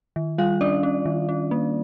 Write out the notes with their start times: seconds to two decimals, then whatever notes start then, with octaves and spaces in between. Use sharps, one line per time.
0.16 D#3
0.38 G3 F4 F5
0.61 C#4 D4 D5
0.83 C#4
1.06 D#3
1.29 C#4
1.51 A#3